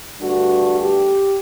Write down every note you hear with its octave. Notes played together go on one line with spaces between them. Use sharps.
G2 D3 A3 D4 F#4
G4